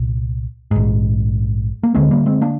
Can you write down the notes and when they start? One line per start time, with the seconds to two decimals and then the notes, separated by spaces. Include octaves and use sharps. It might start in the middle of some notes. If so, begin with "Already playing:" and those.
Already playing: C2 A#2
0.71 A#1 G#2
1.83 A#3
1.95 D2 D3 G#3 C4
2.11 G3 A#3
2.26 G#3 C4
2.41 A#3 D4